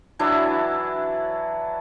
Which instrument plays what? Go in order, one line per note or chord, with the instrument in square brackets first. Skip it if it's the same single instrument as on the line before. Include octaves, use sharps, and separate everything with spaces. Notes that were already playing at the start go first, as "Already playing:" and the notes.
[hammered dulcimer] E3 F#3 D4 E4